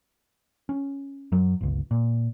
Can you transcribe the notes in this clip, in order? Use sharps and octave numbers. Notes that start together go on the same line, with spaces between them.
C#4
F#2 F#3
G1 C#2
A#2